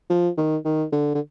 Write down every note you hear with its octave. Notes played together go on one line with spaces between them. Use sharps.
F3
D#3
D#3
D3
D3